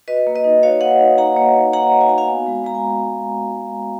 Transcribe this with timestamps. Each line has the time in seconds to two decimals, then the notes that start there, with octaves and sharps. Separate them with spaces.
0.08 F#4 B4 D#5
0.27 A#3
0.35 B4 D#5
0.44 D#4
0.63 F#4 C#5 F5
0.81 A#3 D#5 F#5
1.00 D#4
1.18 A#3 F#5 A#5
1.37 A#3
1.55 A#3
1.73 A#3 F#5 A#5
1.91 A#3
2.01 G#5
2.09 F#4 A#5
2.18 F5 G#5
2.27 B3
2.46 G#3
2.64 G#3 A#5
2.75 G#5